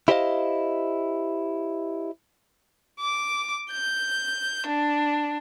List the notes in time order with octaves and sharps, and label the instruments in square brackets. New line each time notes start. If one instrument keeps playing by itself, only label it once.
[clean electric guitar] E4 G4 C5 D5 D#5 F5
[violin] D6
G6
D4